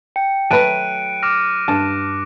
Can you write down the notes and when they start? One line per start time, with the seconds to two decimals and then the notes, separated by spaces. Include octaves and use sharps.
0.16 G5 C#7
0.51 F#3 A3 B4 A5 F#6 D7 D#7
1.23 D6 F6 A#6
1.68 G2 A5